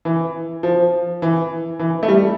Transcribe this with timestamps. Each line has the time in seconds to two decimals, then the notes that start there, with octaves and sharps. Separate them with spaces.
0.05 E3
0.63 F3
1.22 E3
1.79 E3
2.03 A3
2.08 G3